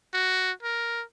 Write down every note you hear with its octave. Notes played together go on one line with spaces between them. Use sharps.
F#4
A#4